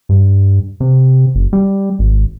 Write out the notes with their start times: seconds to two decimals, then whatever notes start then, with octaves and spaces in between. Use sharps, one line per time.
0.09 G2
0.80 C3
1.35 F#1
1.53 G3
1.99 G#1